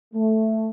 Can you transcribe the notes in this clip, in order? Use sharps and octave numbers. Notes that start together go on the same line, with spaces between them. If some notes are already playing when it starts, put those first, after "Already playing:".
A3